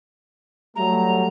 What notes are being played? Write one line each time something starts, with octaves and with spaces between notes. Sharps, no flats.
F#3 G3 A3 A#5